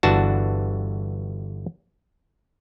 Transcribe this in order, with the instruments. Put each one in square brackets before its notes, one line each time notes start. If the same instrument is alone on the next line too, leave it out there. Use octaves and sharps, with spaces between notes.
[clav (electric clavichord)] G1 E3 D4 F#4 A5